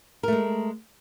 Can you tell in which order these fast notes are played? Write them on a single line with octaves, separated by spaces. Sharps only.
A#4 A3 G#3